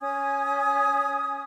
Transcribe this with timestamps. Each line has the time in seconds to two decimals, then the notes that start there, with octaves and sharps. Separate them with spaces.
0.01 C#4 G#5 D#6 G#6